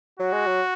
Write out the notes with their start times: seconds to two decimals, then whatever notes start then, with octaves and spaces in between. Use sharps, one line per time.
0.20 F#3 F#4
0.33 G#3
0.47 F#3